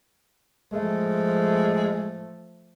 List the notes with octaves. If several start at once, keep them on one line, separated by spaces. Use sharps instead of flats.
F3 G#3 A3